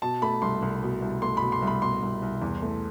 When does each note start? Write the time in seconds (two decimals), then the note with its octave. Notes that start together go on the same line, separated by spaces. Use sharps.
0.02 B2 A5
0.22 A3 B5
0.42 C2 C6
0.62 C2
0.82 B2
1.02 C2
1.22 A3 C6
1.37 B5
1.42 B2
1.52 C6
1.62 C2
1.67 B5
1.82 B2 C6
2.02 C2
2.22 C2
2.42 E2
2.62 A3